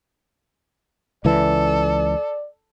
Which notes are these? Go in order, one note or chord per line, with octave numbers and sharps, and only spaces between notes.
C#2 E3 A4 D5